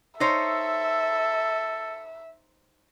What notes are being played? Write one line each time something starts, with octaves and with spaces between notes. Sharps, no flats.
D#4 A4 C5 C#5 E5